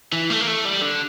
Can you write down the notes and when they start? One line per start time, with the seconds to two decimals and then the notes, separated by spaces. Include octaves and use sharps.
0.12 E3
0.30 A3
0.41 A#3
0.47 A3
0.65 G3
0.82 D3